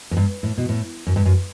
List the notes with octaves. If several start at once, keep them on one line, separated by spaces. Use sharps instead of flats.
F#2
G2
A2
B2
A2
F#2
G2
F#2